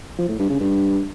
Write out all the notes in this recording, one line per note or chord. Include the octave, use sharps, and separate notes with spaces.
F3
A2
G2
C#3
G2